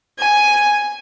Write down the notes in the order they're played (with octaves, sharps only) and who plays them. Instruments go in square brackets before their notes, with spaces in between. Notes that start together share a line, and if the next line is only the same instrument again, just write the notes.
[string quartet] G#5